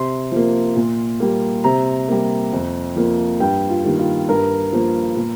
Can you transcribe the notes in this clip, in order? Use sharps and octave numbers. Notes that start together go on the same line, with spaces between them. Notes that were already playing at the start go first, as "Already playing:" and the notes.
Already playing: C3 C6
F3 A#3
A#2
G3 A#3
C3 A#5
G3 A#3
F2
F3 A#3
G2 G5
F4
D#3 G3 A#3
F4
G2 A#4
F3 A#3
A#2